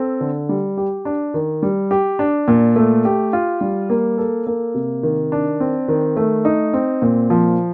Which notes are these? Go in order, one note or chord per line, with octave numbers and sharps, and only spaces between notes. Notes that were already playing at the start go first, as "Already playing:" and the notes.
Already playing: C4 A4
D3
G3
G4
D4
D#3
G3
G4
D4
A#2
A3
G4
F4
G3
A#3
A4
A#3
C3
D#3
D4
C4
D#3
A3
D#4
C4
A#2
F3